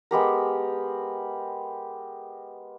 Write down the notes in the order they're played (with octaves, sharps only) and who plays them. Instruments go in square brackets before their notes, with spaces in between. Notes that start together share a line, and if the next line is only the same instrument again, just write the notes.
[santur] G#3 B3 G4 A#4